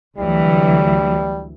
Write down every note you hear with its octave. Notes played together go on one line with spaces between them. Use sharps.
D2 E3 F#3 G3